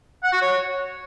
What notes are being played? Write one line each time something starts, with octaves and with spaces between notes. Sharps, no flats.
F#5
F#4
C#5